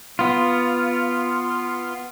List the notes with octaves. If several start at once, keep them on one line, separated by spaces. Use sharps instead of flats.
B3 F4